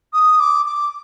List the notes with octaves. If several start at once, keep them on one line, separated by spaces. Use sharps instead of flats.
D#6
D6
D6